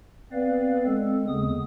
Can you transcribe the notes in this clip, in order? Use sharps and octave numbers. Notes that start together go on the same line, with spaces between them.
B3 C4 B4 D5 F5
G#3 C4 A4
D#2 C#3 G#3 B3 D#6